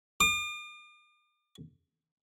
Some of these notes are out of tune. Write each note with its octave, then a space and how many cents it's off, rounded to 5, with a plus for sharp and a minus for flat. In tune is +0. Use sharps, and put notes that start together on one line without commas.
D6 +45